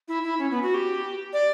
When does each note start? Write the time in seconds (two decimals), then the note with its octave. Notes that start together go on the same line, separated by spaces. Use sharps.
0.08 E4
0.24 E4
0.39 C#4
0.51 B3
0.63 F#4
0.74 G4
1.33 D5